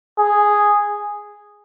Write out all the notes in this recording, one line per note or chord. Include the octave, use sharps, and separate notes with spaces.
G#4